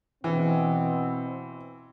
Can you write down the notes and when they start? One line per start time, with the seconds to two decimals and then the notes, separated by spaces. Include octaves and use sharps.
0.24 B2 E3 C4